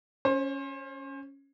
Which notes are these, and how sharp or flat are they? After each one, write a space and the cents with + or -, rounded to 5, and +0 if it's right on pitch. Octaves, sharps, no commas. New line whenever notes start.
C#4 +0 C5 +35